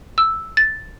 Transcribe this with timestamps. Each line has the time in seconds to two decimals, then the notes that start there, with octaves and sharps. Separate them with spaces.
0.18 E6
0.57 A6